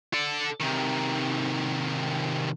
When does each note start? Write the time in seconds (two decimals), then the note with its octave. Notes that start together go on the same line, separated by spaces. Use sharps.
0.13 A4 D5
0.60 C3 D#3